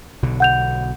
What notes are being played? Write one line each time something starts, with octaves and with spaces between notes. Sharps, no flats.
B1 B2 D3
F#5 G6 F7